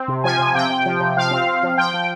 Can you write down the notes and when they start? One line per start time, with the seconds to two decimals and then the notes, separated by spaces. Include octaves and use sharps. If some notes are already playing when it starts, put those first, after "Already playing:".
Already playing: C4
0.08 C3
0.24 F3 G#5
0.39 C3
0.55 C3 G5
0.70 C3
0.86 F3
1.00 C3
1.16 F3 F5
1.31 C4
1.47 C4
1.63 F3
1.77 F3 G5
1.94 F3